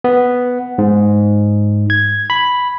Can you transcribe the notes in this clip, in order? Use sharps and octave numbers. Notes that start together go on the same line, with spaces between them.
B3
G#2
G#6
B5